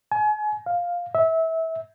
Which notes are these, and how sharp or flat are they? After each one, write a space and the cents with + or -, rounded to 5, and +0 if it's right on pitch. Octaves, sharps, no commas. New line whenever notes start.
G#5 +35
F5 +5
E5 -25